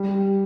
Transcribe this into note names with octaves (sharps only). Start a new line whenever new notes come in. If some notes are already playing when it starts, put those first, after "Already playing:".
Already playing: G3